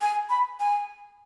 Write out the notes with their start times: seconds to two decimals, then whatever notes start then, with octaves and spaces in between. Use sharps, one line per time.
0.02 G#5
0.30 B5
0.60 G#5